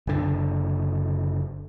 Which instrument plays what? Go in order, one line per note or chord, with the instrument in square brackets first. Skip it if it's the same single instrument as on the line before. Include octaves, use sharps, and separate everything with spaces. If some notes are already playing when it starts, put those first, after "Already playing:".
[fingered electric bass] F#1 D3